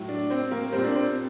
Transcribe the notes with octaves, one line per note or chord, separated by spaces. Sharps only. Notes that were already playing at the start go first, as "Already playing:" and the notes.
Already playing: A2 F#3
D4
C4
A#3
A#2 G3 C4
D4
C4